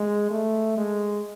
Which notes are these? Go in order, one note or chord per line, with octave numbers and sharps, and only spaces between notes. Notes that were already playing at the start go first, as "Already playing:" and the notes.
Already playing: G#3
A3
G#3